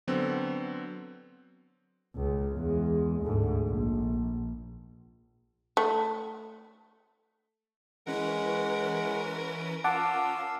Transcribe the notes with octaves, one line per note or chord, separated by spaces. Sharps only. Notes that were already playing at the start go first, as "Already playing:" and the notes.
D3 F#3 B3 C4
C#2
E2 G#3
D2 G#2
A#1
A3
E3 G#3 C#4 A#4 B4 F#5
C#4 F4 F5 F#5 A5 D6 E6